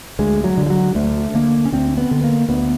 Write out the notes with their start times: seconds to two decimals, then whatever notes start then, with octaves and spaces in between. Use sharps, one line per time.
0.19 D2 G#3
0.44 F#3
0.57 D3
0.66 F3
0.70 F#3
0.95 D2 A3
1.34 D3 A#3
1.65 C#4
1.72 D2 C4
1.97 B3
2.11 D3
2.24 A#3
2.49 D2 B3